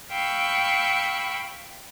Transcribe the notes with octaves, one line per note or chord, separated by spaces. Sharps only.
F5 G5 B5 C#6 E6